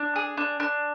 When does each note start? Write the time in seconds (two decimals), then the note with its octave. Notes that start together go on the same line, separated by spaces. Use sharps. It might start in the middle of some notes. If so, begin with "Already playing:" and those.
Already playing: D4
0.16 G#4
0.37 D4
0.60 D4